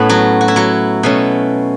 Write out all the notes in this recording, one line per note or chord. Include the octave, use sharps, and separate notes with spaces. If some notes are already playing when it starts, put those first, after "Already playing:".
Already playing: A2 A3 B3 C#4 B4
F#3 F#4
F#4
E4
F#3 F#4
B2 A3 C#4